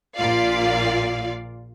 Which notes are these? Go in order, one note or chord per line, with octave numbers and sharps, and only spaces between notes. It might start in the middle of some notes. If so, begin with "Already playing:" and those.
A#1 A#2 F4 D5 F5